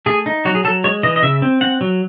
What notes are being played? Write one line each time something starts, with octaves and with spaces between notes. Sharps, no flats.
A3 G#4
D#4
F#3 F#4
G#4
F#3 A4
G#3 C#5
E3 D#5
D#5
C#3 E5
C4
C4 F#5
F#3